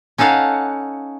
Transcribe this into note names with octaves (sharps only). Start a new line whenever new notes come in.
C#4 D#4 A4 F5 F#5